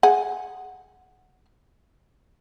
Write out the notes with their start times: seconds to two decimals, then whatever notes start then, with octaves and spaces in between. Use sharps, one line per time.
0.03 G#4 F#5